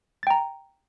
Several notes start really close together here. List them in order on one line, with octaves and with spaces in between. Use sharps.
A6 G5 A#5